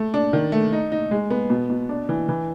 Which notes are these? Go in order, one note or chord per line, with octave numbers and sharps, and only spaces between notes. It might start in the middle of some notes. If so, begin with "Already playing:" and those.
Already playing: A3
D4
D#3
A3
D#4
D#4
G#3
B3
B2
B2
D4
E3
E3